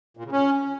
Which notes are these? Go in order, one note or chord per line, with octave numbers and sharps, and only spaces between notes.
A#2
C#3
C#4